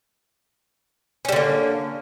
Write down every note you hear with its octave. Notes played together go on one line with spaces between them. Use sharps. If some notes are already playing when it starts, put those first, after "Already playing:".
D3 G3 A#3 C#4